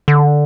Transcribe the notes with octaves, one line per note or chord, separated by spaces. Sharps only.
D3